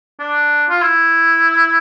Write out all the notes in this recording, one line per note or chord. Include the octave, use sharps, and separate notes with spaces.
D4
F4
E4